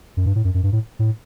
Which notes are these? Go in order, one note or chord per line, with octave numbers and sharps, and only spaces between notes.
F#2
G2
A2
F#2
F#2
G2
A2
A2